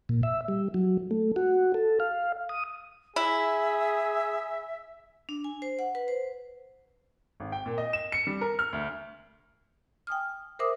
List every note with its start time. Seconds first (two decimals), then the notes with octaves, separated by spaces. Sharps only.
0.09 A#2
0.23 E5
0.48 G3
0.74 F#3
1.11 A3
1.36 F#4
1.74 A4
2.00 F5
2.49 D#6
3.16 E4 G#4 E5
5.29 D4
5.44 G#5
5.62 C5
5.79 F#5
5.95 B4
6.08 C5
7.40 G#1
7.52 G5
7.66 A#2
7.78 D#5
7.93 E7
8.12 C#7
8.27 G3
8.41 A#4
8.59 F6
8.73 D2
10.07 G5 G#5 D#6 F6
10.59 A#4 C5 E5 D6 D#6